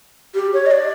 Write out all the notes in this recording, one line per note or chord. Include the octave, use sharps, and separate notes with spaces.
G4
C#5
D#5
D5